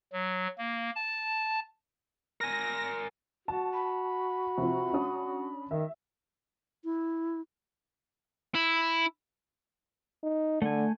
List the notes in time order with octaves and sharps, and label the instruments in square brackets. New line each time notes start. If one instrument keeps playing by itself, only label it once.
[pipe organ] F#3
A#3
A5
[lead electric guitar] A#4 G#5 [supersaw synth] A#6
[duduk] F#4 [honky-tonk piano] A5
[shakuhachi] B5
[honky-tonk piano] C3 F3
C#4 D4 D#6
[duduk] D#3 [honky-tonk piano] E5
[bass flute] E4
[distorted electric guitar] E4
[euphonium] D#4
[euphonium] D3 [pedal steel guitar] A3 G#5